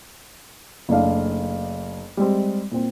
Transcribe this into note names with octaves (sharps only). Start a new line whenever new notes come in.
F#1 A3 D4 F5
G3 G#3 C4
A#2 C4